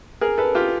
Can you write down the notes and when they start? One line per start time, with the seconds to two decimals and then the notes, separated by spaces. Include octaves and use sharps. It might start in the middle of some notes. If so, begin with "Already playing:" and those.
0.21 G#4 A#4
0.38 A4 B4
0.55 F4 G4